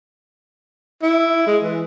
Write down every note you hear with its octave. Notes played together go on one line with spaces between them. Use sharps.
E4
G#3
E3